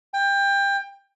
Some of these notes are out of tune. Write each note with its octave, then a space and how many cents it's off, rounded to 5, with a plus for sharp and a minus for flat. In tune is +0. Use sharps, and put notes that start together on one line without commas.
G5 +25